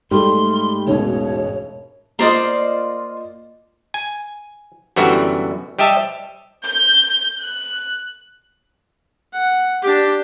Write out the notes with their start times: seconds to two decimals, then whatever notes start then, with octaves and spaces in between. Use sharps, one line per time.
0.11 G#2 G3 A3 C6
0.87 E1 A1 B2 C#5
2.19 A#3 F4 A#4 C5 D5 D#5 C6 D#6
3.94 G#5
4.96 F#2 D3 E3 G3 B3 F#4
5.79 G3 G4 D#5 E5 A5
6.63 G6
7.38 F#6
9.33 F#5
9.82 D4 G4